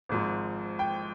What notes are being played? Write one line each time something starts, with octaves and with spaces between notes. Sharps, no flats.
G#1 G#2 F3
G5